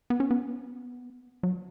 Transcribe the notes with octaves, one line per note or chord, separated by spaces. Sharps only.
B3
C#4
B3
F#3